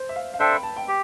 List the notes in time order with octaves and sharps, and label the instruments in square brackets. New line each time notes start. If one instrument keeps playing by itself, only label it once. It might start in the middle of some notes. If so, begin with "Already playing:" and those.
Already playing: [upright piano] C5
E5
F5
F5
[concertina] D4 A4 C5 E5 [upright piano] G5
[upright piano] B5
A5
G5
[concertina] G4